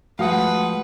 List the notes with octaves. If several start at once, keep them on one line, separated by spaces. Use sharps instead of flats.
F3 G#3 A3 F#4 B4 F5 F#5 D#6